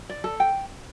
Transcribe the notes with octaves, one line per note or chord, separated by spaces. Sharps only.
D5
A4
G5